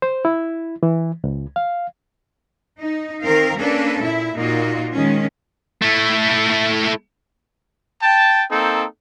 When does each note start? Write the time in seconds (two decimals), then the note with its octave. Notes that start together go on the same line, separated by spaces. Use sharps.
0.02 C5
0.25 E4
0.83 E3
1.24 C#2
1.56 F5
2.79 D#4
3.22 D#3 C4 A#4 F5
3.58 A#3 C#4 D4 A4 B4
4.02 A#2 E4 E5
4.36 A#2 A#3 D#4 F4 F#4
4.94 D#3 G#3 C#4
5.82 A3 E4
8.02 G5 A5
8.50 A#3 C4 D#4 A4